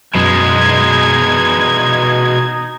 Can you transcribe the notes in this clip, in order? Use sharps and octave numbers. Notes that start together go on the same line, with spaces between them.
F#2 B2 G#3 D#4 G#6